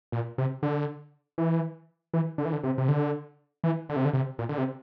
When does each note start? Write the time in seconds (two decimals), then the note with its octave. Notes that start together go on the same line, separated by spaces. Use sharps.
0.12 A#2
0.38 C3
0.63 D3
1.38 E3
2.14 E3
2.38 D3
2.45 E3
2.53 D3
2.63 C3
2.78 C3
2.88 D3
3.64 E3
3.89 D3
3.96 C3
4.05 D3
4.13 C3
4.39 A#2
4.49 D3
4.58 C3